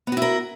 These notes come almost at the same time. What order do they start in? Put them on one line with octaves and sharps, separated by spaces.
B3 F#4 E4 A#4